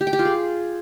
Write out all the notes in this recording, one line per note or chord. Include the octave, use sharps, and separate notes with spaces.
G4
G5
G4
F4
G#4